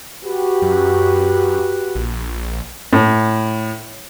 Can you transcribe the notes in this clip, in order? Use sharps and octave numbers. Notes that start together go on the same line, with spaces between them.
F#4 G4 B4
F#2
A#1
A2